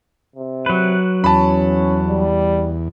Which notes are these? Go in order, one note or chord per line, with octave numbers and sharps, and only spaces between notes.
C3
F#3 B4
E2 C#4 A5 B5
G3